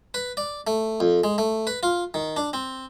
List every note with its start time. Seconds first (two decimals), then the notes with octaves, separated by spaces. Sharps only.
0.14 B4
0.37 D5
0.67 A3
1.00 F2
1.24 G#3
1.38 A3
1.67 B4
1.83 F4
2.14 D#3
2.37 D4
2.53 C4